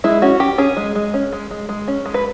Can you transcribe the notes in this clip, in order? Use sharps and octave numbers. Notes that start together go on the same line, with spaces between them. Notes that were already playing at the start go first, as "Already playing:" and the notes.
G#3 E4
C#4 F#4
C#4 G4
C#4 G#4
G#3
G#3
C#4
G#3
G#3
G#3
C#4
G#3
B4